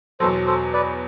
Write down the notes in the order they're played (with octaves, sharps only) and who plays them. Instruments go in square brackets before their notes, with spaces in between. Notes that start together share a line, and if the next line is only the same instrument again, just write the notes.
[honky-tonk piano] E2 B2 F#3 [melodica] A4 C5
[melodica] A4 C5
B4 D5